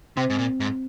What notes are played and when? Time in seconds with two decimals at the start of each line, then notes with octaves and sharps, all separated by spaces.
0.17 C3 C4
0.30 G#2
0.38 A#2
0.60 G#2